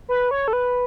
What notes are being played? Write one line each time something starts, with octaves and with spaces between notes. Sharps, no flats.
B4
C#5
A4
B4